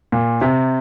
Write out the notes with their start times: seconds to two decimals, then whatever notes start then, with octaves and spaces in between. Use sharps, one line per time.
0.12 A#2
0.41 C3